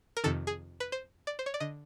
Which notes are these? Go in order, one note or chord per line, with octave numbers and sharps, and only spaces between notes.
A#4
F2 C3 D#3 A4
G#4
B4
C5
D5
C5
C#5
D5
D3 D#5